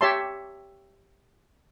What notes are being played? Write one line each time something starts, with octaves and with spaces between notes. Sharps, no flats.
G4 C#5 E5 A5 C6